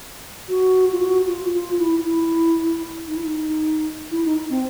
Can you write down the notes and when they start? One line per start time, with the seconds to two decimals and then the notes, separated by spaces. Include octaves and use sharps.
0.49 F#4
0.92 F4
1.00 F#4
1.27 F4
1.53 F4
1.78 E4
2.05 E4
3.08 D#4
3.16 E4
3.24 D#4
4.11 E4
4.25 D#4
4.50 C4